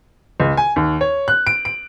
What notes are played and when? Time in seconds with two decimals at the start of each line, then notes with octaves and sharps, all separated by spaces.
0.40 C#2
0.57 G#5
0.76 D#2
1.01 C#5
1.28 F#6
1.47 D7
1.65 D7